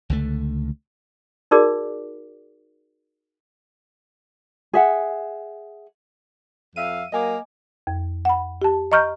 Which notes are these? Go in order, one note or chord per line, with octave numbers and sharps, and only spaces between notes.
C#2 D3 A3
D#4 F#4 G#4 A#4 D5 D6
G#4 E5 F#5
F2 E5 F5 D#7
F#3 A#3 D#5 G#5 D6
F2
F#5 B5
G4 A5
D#5 A#5 C#6 F6 G6